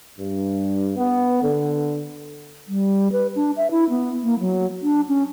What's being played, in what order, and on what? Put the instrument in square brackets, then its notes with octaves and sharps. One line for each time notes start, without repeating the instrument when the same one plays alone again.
[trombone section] G2
B3
D3
[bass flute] G3
B4
D4
E5
E4
B3
A#3
F#3
D4
C#4